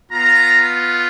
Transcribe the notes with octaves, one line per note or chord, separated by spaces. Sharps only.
B3 F4 A#5